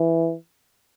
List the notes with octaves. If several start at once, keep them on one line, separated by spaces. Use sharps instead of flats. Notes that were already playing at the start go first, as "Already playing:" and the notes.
Already playing: E3